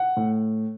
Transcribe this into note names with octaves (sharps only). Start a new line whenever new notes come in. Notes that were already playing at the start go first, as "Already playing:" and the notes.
Already playing: F#5
A2